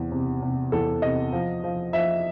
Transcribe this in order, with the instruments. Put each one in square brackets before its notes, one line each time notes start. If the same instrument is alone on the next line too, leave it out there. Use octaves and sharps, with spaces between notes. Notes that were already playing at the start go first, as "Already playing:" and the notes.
Already playing: [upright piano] E2 C3
C3
C3
E2 A4
C3 D#5
F3
F3
F3 E5